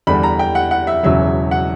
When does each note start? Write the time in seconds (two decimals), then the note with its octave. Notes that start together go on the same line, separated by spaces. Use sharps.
0.07 E2 D3 G3 B5
0.23 A#5
0.39 G5
0.55 F#5
0.71 F#5
0.87 E5
1.03 E1 E2 C#3 F#3 E5
1.51 F#5